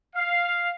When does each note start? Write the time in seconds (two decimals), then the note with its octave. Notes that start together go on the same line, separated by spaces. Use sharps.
0.16 F5